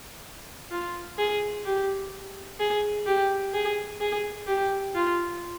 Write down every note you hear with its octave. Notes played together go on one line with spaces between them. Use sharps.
F4
G#4
G4
G#4
G4
G#4
G#4
G4
F4